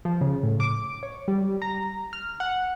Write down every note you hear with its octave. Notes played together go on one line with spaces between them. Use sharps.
F3
C#3
A2
D6
C#5
G3
A#5
F6
F#5